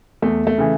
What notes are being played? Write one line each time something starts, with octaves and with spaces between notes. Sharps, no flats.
E2 A3
A3
C#3 E3